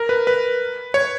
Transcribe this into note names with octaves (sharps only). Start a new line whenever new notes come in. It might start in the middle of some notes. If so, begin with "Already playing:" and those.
Already playing: A#4
B4
B4
C#5